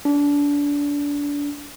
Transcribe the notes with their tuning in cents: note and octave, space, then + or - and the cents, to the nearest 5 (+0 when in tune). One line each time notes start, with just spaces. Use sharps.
D4 -30